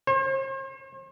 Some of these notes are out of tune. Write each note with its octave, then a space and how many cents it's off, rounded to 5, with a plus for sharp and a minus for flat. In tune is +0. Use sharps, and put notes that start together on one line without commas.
C5 +45